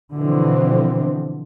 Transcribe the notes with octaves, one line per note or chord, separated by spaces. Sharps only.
B2 D3 E3 F3 C4